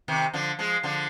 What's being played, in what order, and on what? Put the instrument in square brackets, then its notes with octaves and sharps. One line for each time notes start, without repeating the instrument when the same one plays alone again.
[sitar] C3 D#3
D3 F3
F3 G#3
D3 F3